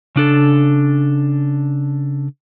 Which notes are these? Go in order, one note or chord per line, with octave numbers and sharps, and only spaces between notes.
C#3 D4 A4